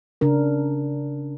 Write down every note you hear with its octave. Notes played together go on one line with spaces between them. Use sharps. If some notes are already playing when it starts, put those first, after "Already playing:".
C#3 D4 A#4